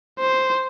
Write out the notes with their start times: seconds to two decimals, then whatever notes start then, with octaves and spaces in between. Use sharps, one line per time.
0.20 C5